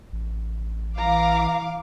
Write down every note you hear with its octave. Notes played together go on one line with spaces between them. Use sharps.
A1
E3 F5 A#5 D6